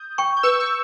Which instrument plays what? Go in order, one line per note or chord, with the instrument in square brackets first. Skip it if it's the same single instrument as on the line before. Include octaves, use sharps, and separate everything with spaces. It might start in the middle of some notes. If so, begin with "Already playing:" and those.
Already playing: [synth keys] D#6 G6
[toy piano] G5 C#6
[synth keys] G6
[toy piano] B4 [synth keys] C#6 E6
[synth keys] C#6 E6